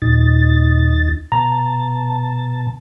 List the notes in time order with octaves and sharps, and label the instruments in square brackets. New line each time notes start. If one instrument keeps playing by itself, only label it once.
[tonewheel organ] D#2 D#4 A6 [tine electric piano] A#2
[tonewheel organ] B2 A5 [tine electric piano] A#5